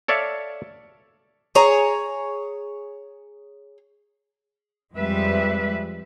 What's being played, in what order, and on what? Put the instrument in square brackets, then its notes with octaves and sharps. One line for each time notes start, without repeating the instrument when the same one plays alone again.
[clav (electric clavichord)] A4 C#5 D5 E5 F5
[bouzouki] G#4 C#5 A#5
[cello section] F2 G3 G#3 B4 E5